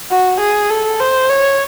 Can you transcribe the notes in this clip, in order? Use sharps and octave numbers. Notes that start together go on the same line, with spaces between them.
F#4
G#4
A4
C5
C#5